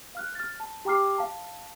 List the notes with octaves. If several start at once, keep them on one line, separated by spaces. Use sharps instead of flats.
F5 F6 F#6
F6 A6
A5
G4 G5 A#5 D6 F6 C7
F5 A5